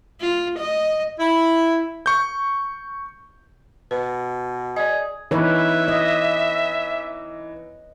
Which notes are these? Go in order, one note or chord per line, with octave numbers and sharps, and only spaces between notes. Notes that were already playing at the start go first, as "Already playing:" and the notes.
F4
D#5
E4
C#6 G6
B2 B4
G#4 D5 D#5
E3 D#4 B4 C#5 E5
D#5